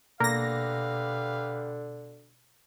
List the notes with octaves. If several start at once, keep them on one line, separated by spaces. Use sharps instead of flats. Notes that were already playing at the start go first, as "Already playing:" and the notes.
B2 D3 A#3 G4 B4 F5 A#6